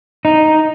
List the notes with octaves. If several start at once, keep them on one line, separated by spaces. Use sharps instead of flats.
D#4